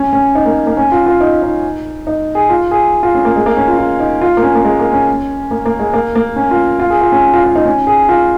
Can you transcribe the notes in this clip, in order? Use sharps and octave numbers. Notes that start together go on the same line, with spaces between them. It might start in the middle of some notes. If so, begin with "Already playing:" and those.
Already playing: C#4
C#4
D#4
A#3
A#3
C#4
F4
F4
D#4
D#4
D#4
G#4
F4
G#4
F4
C#4
A#3
G#3
A#3
C#4
F4
F4
D#4
F4
A#3
C#4
A#3
G#3
A#3
C#4
A#3
A#3
G#3
A#3
A#3
C#4
F4
F4
G#4
F4
C#4
F4
F4
D#4
C#4
G#4
F4